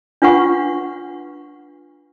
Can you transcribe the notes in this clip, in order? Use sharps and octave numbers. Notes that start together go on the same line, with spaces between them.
D4 F4 B4 F#5 C#6